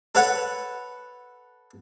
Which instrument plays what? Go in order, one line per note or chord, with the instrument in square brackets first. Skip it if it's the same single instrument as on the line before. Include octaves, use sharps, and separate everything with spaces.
[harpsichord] A4 B4 C#5 F#5